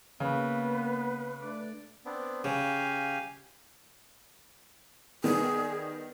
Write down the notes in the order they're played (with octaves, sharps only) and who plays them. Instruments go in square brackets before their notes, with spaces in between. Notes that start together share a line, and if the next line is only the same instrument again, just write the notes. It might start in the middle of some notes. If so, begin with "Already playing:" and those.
[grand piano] C#3 [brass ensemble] A#3 B3 [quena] B4
[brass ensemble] A3 D4 D5
[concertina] B3 C4 D4
[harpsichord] C#3 [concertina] G4 F5 G#5
[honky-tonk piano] D#3 G3 B3 [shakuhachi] G#4